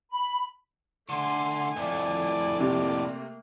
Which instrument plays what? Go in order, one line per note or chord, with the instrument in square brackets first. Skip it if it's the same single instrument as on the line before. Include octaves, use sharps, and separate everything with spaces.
[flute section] B5
[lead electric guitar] D3 [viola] A3 G#5 [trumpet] C6
[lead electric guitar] F2 A2 [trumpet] D5
[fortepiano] C3 [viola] A3 A#3 [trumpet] D5